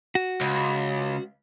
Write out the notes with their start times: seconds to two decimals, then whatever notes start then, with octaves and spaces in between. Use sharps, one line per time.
0.15 F#4
0.41 C#2